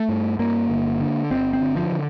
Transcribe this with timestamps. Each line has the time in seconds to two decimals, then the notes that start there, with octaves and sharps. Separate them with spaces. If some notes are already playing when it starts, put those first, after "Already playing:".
Already playing: A3
0.09 G2
0.39 G2 A#3
0.69 G1
1.00 D3
1.31 G1 C4
1.53 C4
1.61 D3
1.76 F3
1.92 D3